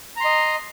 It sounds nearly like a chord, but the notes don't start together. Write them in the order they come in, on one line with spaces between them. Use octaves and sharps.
A#5 C6 D#5